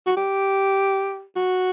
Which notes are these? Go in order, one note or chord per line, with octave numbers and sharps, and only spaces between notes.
F#4
G4
F#4